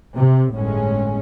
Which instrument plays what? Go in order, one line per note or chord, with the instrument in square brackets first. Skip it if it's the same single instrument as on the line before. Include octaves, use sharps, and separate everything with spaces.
[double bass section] C3
G1 A2 G#3 C#4